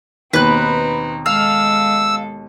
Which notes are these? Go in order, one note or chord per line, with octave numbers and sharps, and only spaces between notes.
D#2 B2 C4 D#4 B4 F#6
G#3 A4 F5 E6